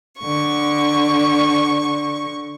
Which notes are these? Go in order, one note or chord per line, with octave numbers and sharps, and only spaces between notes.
D3 C#6